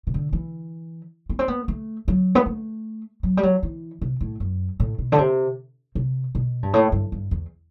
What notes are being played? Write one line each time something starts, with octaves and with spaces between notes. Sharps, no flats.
C3
D3
E3
B3
C4
B3
A3
F#3
B3
A3
F#3
G3
F#3
E3
C3
A2
F#2
A2
B2
D3
C3
C3
B2
G2
A2
G2
G2
E2